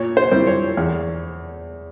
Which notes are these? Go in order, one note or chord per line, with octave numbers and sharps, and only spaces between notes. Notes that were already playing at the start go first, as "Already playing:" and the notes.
Already playing: A#2 C#5
C5
G3 C4 E4
C#5
E2